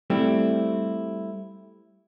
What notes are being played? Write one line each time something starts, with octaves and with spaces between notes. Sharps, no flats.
G3 A3 C4 E4